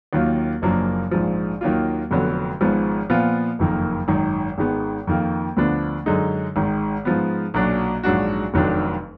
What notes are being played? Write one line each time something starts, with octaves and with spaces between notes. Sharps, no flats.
D#2 D#3 F#3 A#3 F4
F#1 F#2 F3 A#3 D4
A#1 G#2 F3
D#2 D#3 F#3 A#3 F4
F1 F2 D3 F#3 B3
G#1 G#2 F3 B3
A#2 F3 B3 F4
F#1 F2 D#3 A#3
G#1 F#2 D#3
G#1 G#2 D#3 G#3 B3
F2 D#3 A#3 F4
D2 D3 F3 B3 D4
F#2 D3 G#3 D#4
G#1 G#2 D#3
G#2 F3 B3
B1 A#2 F#3 D4 F#4
A#1 G#2 F#3 D4 F#4
F1 F2 D#3 F#3 D4